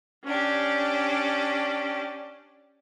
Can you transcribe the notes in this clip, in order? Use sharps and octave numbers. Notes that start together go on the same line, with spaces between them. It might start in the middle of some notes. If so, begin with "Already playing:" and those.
C#4 D4 G4